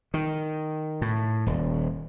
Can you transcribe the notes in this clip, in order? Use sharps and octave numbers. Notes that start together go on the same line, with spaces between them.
D#3
A2
D#1